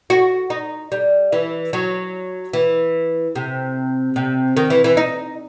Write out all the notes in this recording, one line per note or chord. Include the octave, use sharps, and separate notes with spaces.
F#4
D#4
G3
E3
F#3
E3
C3
C3
D#3
E3
E3
D#4